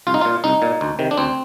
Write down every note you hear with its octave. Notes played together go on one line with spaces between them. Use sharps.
C2 F4
D#4
A#2 F4
C2 D#4
A#2
D2
C3 D#3
D4
D2 C4